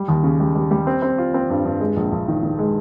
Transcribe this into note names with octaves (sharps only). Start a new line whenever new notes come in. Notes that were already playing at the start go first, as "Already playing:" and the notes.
Already playing: G3
D#2
C#3
G3
G3
G3
C4
C4
F4
C4
G2
G2
G#3
A#1
A#1
D#3
D#3
G#3